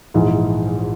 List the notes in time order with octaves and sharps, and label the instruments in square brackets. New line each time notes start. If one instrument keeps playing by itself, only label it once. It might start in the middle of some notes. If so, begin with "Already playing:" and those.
[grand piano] A#1 G#2 E3